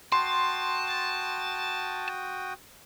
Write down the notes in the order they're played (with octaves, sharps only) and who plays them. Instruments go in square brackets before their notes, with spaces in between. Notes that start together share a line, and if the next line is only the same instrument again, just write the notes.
[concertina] F#4 G5 D#6 [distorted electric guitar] A5 [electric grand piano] C6